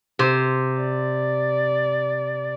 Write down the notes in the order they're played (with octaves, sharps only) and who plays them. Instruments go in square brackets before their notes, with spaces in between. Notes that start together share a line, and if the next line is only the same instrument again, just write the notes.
[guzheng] C3 C5
[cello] D5